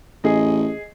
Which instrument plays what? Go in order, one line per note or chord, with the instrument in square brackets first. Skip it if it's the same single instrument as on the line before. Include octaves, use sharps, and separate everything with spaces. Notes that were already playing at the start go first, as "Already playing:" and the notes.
[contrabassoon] A1 [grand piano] G#4 D#5